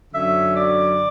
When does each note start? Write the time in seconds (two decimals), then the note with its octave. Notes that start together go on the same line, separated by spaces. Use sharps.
0.12 F#2 D3 F#3 C#4 E5
0.55 D5